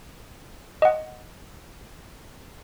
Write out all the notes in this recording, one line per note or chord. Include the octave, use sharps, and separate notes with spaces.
D#5 F#5